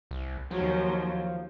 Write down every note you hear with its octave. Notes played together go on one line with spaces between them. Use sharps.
C2
D#2 F3 F#3